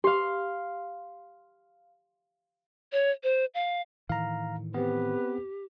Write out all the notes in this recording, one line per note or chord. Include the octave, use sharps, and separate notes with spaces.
G4 F5 C6
C#5
C5
F5
A2 D#3 E3 F5 A#5
B3 C4 G4 B4